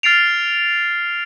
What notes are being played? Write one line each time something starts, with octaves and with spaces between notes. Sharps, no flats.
F6 A6 C7 D7 F7